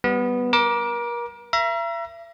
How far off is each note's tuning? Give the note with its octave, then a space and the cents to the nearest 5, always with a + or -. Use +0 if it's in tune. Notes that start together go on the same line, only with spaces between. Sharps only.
G3 -5 B3 +0
A#4 +35 D6 +0
E5 +40 A#5 +30